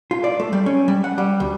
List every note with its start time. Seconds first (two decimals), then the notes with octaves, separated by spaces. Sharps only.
0.11 F4
0.24 D5
0.40 A3
0.53 G3
0.66 C#4
0.88 G3
1.04 F#5
1.18 G3
1.40 D2